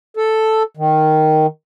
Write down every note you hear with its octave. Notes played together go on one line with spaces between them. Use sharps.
A4
D#3